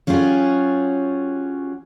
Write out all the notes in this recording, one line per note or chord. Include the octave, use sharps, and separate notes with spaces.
F#3 C#4 F4 G4 G#4